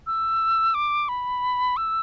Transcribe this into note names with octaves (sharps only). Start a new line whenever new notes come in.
E6
D6
B5
E6